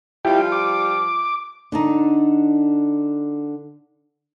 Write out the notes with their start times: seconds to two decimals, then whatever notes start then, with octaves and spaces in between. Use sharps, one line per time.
0.25 F3 G3 E4 F4 G4 G5
0.52 D6
1.72 D3 D4 D#4